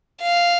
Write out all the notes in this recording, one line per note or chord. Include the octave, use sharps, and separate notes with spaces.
F5